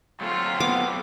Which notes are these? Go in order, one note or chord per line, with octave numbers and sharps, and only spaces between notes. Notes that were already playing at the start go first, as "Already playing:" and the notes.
F#3 A3 C4 F4
B3 D6